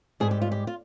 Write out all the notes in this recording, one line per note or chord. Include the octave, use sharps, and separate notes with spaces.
G#2 G3 G#4
G4
F4
G4
F4